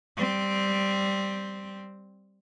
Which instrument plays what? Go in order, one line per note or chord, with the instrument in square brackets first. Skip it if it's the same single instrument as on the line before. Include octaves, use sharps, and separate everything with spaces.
[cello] G3 C4